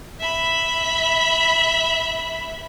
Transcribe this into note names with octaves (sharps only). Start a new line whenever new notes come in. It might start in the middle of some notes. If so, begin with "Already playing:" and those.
E5 B5